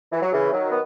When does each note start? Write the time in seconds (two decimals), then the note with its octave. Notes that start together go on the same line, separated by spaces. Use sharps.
0.12 E3
0.22 F#3
0.32 C#3 E3
0.52 D#3 F#3
0.70 B3